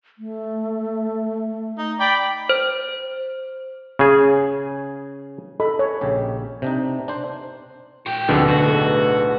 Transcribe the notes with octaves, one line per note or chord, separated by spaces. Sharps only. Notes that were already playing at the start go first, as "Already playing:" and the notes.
A3
D#4
D5 G5 B5
C5
C#3 G#4
A4 D#5 B5
C#5
A#1 C#3 G4
C3 D4 D#4
D4 C5
F#4 G5
D1 F2 B2 D3 F3 E5
D#4 F#4 B4
A3 G#4 D#5